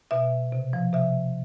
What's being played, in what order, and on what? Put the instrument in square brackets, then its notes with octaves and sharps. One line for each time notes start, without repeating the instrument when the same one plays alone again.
[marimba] B2 E5
C3
F3
C3 E5